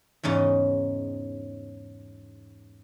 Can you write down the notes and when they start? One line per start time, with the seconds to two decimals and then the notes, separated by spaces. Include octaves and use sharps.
0.23 E2 G#2 C#3 D#4